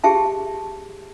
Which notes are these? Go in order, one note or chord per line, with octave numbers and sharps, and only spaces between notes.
G4 G#4 E5 A5